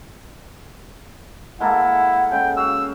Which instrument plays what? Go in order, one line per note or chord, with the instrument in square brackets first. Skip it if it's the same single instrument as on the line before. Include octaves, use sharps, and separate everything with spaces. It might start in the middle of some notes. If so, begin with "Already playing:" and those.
[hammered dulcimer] G#3 A#3 A4 [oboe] E4 [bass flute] F#5
[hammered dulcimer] C#3 G#3 [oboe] G5
[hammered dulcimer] F#4 F5 [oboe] E6